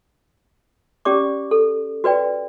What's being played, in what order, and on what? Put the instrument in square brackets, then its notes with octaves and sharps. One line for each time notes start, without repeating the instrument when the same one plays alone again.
[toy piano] C#4 G4 D5 D6
A4
F#4 B4 D5 G5